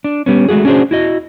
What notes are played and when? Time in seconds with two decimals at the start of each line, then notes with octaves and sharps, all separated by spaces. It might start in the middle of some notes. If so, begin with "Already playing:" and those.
0.04 D4
0.26 G3 B3 C#4
0.49 G#3 A3 F#4 G#4
0.65 C#4 D4 F#4 G#4 C5
0.91 E4 F#4 D#5